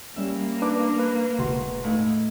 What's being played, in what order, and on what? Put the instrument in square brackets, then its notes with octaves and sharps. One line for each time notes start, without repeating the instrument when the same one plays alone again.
[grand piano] G3 C#4 [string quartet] A#3 [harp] E5
[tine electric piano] D4 B4 D6
B4
[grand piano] E1 F#4 C6
[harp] A2 D#4 [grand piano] F5